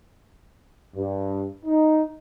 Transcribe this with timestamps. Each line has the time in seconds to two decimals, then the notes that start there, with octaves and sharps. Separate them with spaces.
0.96 G2
1.66 D#4